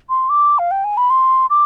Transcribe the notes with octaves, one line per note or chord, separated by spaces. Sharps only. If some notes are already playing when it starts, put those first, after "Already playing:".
C6
D6
F5
G5
G#5
B5
C6
D6